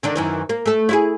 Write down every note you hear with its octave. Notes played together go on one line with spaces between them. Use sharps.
D3 D#3 D4
F#2 D#3 E3
A#3
A3 A4
E4 F4 G#4